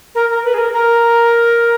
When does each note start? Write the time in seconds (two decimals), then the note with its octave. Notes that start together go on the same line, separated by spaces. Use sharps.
0.15 A#4
0.29 A#4
0.43 B4
0.53 G#4
0.58 A#4
0.72 A#4